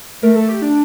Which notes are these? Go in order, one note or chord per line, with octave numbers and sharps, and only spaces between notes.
A3 A#4
A4
G4
D4